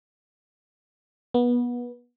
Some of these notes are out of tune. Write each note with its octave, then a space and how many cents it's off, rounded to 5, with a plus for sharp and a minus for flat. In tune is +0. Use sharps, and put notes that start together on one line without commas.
B3 -25